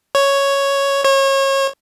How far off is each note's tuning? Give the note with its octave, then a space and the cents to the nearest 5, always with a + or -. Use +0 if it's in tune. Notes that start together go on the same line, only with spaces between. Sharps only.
C#5 +0
C#5 -30